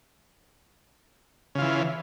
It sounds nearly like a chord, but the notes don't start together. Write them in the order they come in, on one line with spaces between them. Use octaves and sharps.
C#3 F4 E3